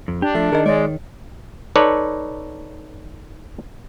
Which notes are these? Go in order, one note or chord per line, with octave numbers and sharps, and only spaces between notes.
F2
D4 G4
F3 A3
D#3 G#4 A#4 D#5
G#3 C#5 D5 A6
D#4 A4 B4 C#5 D5